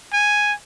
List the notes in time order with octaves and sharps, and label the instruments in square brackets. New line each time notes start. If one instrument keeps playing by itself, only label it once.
[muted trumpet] G#5